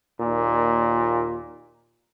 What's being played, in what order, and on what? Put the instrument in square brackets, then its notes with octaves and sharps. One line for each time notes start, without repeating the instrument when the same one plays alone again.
[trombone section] D#2 A#2